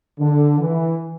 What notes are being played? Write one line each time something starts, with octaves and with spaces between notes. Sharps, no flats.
D3
E3